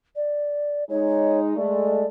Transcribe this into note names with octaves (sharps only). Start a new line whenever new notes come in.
D5
G#3 D#4 C#5
G#3 A3 D5